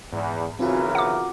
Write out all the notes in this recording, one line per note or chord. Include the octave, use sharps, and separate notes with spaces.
E2 G#2
B1 C#3 E3 C4 F4 F#4 A#4
F#5 D6